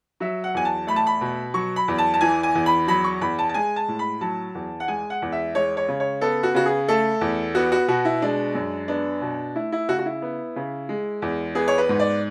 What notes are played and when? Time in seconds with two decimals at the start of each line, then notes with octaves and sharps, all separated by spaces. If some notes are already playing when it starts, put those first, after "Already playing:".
0.20 F#3 E5
0.44 F#5
0.54 E2 G#5
0.65 A5
0.87 A3 B5
0.96 A5
1.07 B5
1.21 B2
1.54 F#3 C#6
1.76 B5
1.88 E2
1.98 A5
2.14 A5
2.21 E3 G#5
2.43 G#5
2.55 E2
2.66 B5
2.87 F#3 B5
3.04 C#6
3.21 E2 B5
3.39 A5
3.49 A5
3.54 G#3 G#5
3.76 A5
3.88 A2
3.99 B5
4.21 F#3 A5
4.55 E2
4.80 F#5
4.88 G#3 G#5
5.10 F#5
5.22 E2
5.32 E5
5.55 G#3 C#5
5.77 C#5
5.88 C#3
6.00 C#5
6.21 B3 A4
6.43 F#4
6.55 C#3 F#4
6.66 G#4
6.88 A3 A4
7.21 E2
7.55 B3 F#4
7.72 F#4
7.88 B2 F#4
8.05 E4
8.22 G#3 D4
8.55 F#2
8.88 B3 D4
9.22 B2
9.55 A3 E4
9.72 E4
9.88 C#3 F#4
9.99 F#4
10.06 E4
10.22 B3
10.56 C#3
10.89 G#3
11.22 E2
11.55 B3 G#4
11.68 C#5
11.78 B4
11.89 G#2
11.99 D5